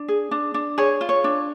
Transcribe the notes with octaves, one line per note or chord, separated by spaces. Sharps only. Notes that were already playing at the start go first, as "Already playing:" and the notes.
Already playing: D4
G#4
D4
D4
G#4 C#5
F4
C#5
D4